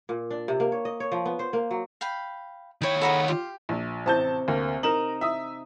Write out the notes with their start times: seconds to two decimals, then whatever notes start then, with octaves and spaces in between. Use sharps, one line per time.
0.09 A#2
0.31 D4
0.48 C3
0.60 A#3
0.72 C#5
0.85 D#5
1.00 C#5
1.12 F3
1.26 B3
1.39 C5
1.53 A#3
1.71 F#3
2.01 F5 G5 B5
2.81 D#3 E4 C#5 G5
3.01 G#4 A4 F#5 A#5 B5
3.28 F4 G4
3.69 A#1
4.06 A1 C3 A5 G6
4.48 D2 A#3
4.83 D#4 A#4 E7 F#7
5.21 E5 D#6